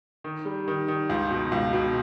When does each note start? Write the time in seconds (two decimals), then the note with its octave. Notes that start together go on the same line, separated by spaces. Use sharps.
0.24 D#3
0.45 G3
0.68 D#3
0.88 D#3
1.09 C#2
1.31 B2
1.52 C#2
1.73 B2